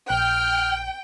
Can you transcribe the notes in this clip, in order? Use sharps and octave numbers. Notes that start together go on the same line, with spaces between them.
A#1 G5 F6